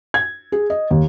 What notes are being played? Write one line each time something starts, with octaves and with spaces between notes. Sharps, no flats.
G#6
G#4
D#5
D#2